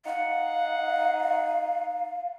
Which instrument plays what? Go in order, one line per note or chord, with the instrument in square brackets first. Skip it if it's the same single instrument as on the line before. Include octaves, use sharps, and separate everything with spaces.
[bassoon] D#4 [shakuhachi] F5 [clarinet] F#5